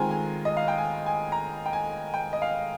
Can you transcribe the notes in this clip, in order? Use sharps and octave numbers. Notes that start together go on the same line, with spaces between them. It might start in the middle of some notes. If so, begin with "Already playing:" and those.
Already playing: D#3 G#3 C4 F4 G#5 A#5
G#5
D#5
F5
G5
G#5
G#5
A#5
G5
G#5
G5
D#5
F5